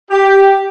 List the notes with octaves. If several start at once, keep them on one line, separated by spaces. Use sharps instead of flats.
G4